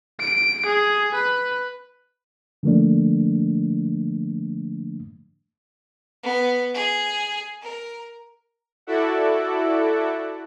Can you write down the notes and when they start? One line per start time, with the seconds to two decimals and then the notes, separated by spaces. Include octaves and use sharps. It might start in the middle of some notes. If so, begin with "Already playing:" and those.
0.20 D7
0.66 G#4
1.15 B4
2.63 D3 F3 A3 A#3 D4
6.23 B3
6.74 G#4
7.62 A#4
8.87 E4 F#4 A4 D5 E5 F#5